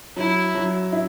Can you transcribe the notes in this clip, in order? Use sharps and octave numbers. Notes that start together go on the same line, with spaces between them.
F#3 E4
F#3
E4